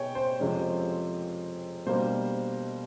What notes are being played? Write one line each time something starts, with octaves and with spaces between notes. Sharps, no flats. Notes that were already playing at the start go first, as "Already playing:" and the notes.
Already playing: B2 B3 C#5 G5 G#5
C5
F2 C3 F3 G#3 C#4
B2 G3 A#3 D4 C5